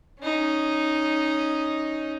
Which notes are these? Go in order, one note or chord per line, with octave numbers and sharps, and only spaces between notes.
C#4 D#4